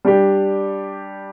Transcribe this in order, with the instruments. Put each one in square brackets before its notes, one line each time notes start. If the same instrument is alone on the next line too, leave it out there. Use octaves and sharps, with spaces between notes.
[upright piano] G3 D4 G4